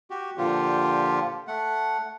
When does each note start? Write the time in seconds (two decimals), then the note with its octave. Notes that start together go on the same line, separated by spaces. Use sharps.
0.10 F#4 G4
0.38 A#2 D3 F3 F4 G4
1.48 A3 F#5